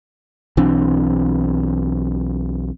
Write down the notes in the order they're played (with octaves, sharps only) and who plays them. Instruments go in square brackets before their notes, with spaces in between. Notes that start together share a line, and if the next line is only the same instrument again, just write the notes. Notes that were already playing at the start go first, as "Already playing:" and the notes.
[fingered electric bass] B1 E3 C4 D4